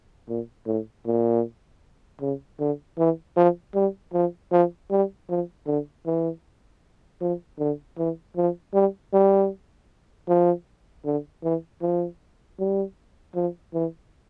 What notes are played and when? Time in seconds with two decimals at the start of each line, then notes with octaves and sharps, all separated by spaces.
0.28 A#2
0.67 A2
1.06 A#2
2.21 C#3
2.60 D3
2.98 E3
3.37 F3
3.75 G3
4.14 F3
4.52 F3
4.91 G3
5.29 F3
5.67 D3
6.06 E3
7.21 F3
7.59 D3
7.98 E3
8.37 F3
8.74 G3
9.13 G3
10.28 F3
11.05 D3
11.43 E3
11.82 F3
12.59 G3
13.35 F3
13.74 E3